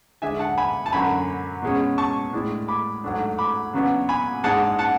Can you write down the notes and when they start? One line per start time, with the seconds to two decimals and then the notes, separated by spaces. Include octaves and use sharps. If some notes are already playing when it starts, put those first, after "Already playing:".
0.22 D3 G#3 D4 E5 G#5
0.39 F#5 A5
0.57 G#5 B5
0.86 A5
0.92 F#2 D3 F#3 G#5 B5
1.62 B2 G#3 C#4
1.98 A5 C#6
2.33 A2 G#3 D4
2.68 B5 D6
3.04 G#2 F#3 A3 D4
3.38 B5 D6
3.73 C#3 F#3 B3 D4
4.09 G#5 B5
4.44 G#2 G#3 D4 F#5 A5
4.79 F#5 A5